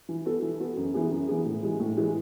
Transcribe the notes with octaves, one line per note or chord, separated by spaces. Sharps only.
E3
B3 F#4 A4
E3
B3 F#4 A4
F#2
E3 B3 E4 G#4
F#2
E3 B3 E4 G#4
A2
E3 G#3
A2
E3 G#3